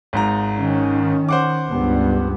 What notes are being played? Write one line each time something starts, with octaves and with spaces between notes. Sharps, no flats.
G#1 G#2 A#5
D#3 C#4
C5 F#5 D6
C#2 G2 B3